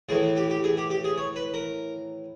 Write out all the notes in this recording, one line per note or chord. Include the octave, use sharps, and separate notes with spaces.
A2 E3 G#4
G4
G4
G#4
G4
G4
G#4
C#5
B4
A#4